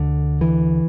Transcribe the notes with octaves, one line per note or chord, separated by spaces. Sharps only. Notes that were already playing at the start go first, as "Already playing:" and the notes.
Already playing: D2 D3
E3